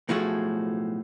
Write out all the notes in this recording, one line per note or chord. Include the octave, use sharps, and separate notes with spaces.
B1 A2 F3 A3 F#4 G#4